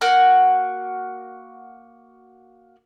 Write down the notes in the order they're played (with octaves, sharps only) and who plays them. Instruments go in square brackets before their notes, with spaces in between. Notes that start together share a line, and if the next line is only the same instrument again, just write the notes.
[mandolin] A#3 F#4 F#5 F#6